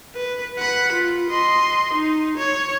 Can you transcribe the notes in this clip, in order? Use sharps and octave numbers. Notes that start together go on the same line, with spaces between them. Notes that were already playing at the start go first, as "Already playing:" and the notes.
B4
F#5 B5
F4
D#5 C6
D#4
C#5